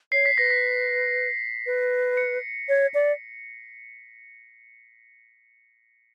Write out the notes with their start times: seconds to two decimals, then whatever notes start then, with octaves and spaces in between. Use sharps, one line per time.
0.12 C#5 C7
0.25 B6
0.38 B4 A#6
0.51 B6
1.66 B4
2.17 C#7
2.69 C#5
2.94 D5